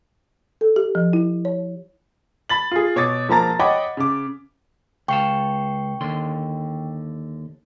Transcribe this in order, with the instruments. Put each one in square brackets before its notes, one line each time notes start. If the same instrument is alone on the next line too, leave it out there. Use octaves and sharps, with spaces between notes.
[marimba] A4
G4
F3
E4
C#5
[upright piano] B5 A6 F#7
F4 G#4
B2 C#5 D6 D#6 A6
E1 F3 A#3 A5 A#5 A6
C#5 D#5 F#5 G5 B5 D6
C#3 D6
[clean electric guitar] C#2 F5 A5 [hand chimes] G5 C#6
[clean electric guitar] D#2 D3 C6